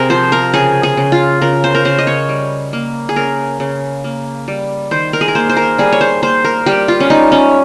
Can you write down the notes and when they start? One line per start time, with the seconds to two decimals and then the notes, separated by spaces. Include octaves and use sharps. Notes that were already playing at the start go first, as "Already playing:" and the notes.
Already playing: C3 G#4 A#4
0.10 F3 C5
0.32 A#4
0.54 C#3 G#4
0.83 G#4
0.97 C#3
1.12 F4
1.41 C#3 A#4
1.64 C5
1.75 A#4
1.85 C#3 C5
1.98 D#5
2.07 C#5
2.29 G3
2.73 A#3
3.09 G#4
3.16 C#3 A#4
3.60 C#3
4.04 A#3
4.48 G3
4.91 D#3 C5
5.13 A#4
5.21 G#4
5.28 A#4
5.35 A#3 C5
5.49 C5
5.57 A#4
5.78 G3 G#4
5.92 C#5
6.01 C5
6.23 A#3 C5
6.44 A#4
6.66 G3 G4
6.88 F4
7.00 C#4
7.10 G3 D#4
7.32 C#4